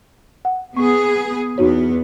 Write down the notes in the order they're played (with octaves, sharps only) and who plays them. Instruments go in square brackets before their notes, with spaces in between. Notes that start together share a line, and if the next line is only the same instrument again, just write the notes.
[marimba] F#5
[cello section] B3 G#4 [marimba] C#6
[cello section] E2 B3 [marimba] D#4 F#4 C#5